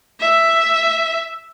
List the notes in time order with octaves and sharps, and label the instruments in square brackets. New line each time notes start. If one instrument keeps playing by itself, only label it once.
[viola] E5